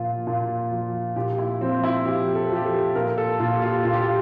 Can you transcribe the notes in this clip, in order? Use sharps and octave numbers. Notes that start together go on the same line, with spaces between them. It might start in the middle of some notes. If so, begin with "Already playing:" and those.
Already playing: A#2 F3 F4
A#2
F3
A#2 G4
E4
F3 C4
E4
F3 G4
A4
F3 G4
A4
A#2 A#4
A4
A#2 F4
G4
F4
A#2 F4
G4
F4